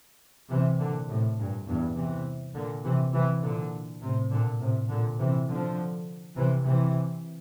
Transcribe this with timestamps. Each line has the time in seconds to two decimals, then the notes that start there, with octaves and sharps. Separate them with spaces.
0.50 C3 E3
0.79 A#2 D3
1.08 A2 C3
1.38 G2 A#2
1.67 E2 G2
1.96 C3 E3
2.55 A#2 D3
2.85 C3 E3
3.14 C3 E3
3.43 A#2 D3
4.02 A2 C3
4.31 A#2 D3
4.60 A2 C3
4.90 A#2 D3
5.19 C3 E3
5.48 D3 F3
6.36 C3 E3
6.65 C3 E3